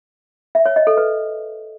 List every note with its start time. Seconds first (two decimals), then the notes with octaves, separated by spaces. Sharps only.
0.55 E5
0.66 C#5
0.76 D#5
0.87 A4
0.97 B4